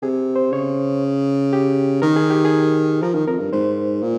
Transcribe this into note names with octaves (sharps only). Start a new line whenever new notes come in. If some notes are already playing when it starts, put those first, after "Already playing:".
C3 G#4
C5
C#3 C#5
G4
D#3 A#4
G#4
G4
G#4
F3 A#4
D#3
F2 A#4
G2
G#2 C5
A#2